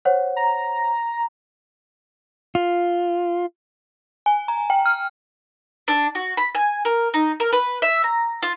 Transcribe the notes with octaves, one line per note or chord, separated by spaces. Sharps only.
C5 C#5 F#5
A#5
F4
G#5
A#5
G5
F6
D4
F#4
B5
G#5
A#4
D#4
A#4
B4
E5
A#5
F4